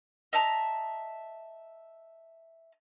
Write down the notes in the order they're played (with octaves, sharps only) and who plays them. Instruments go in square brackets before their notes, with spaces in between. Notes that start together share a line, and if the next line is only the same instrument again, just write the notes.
[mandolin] D#5 E5 A5 A#5